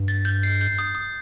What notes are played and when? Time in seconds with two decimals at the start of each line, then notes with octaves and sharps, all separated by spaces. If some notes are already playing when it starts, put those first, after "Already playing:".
Already playing: G2
0.08 A6
0.25 G6
0.43 C7
0.61 G6
0.79 D#6
0.95 D#6